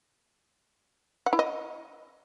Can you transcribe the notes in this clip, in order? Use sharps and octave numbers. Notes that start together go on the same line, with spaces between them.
F#5
E4
D#5